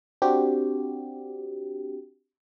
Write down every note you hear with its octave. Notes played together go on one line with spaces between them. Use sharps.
C4 D4 F#4 G4